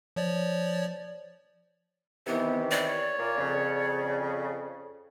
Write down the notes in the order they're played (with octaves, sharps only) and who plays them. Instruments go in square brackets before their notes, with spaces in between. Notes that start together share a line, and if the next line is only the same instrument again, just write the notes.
[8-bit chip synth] F3 C#5 D5
[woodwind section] C3 D#3 E3 [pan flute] B3
[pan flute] D5
[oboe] C#5
[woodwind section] A#2 A#3
F2 C#3